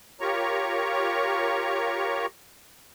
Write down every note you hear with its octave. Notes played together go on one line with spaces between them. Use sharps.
F4 G4 A#4 C#5 A#5 C#6